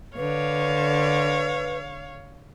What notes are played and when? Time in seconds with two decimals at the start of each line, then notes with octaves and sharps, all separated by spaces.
0.17 D3 B4 C#5 F5